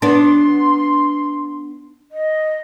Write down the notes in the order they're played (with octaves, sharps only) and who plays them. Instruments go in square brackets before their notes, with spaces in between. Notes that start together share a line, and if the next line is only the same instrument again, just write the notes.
[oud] B3 D4 [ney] C6
[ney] D#5